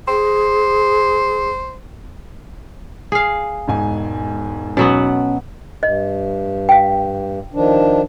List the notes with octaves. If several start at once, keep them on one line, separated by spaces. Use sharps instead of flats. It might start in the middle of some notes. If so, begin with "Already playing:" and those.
G#4 C5
G#4 F5
E1 G#2 G#5
B2 F#3 B3 C#4
G2 D#5
F5 G5
D#3 F3 D4